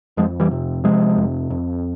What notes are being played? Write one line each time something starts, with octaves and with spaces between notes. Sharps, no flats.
F2 F3 G#3
E3 G3
C3
C3 F3 G#3
F2
F2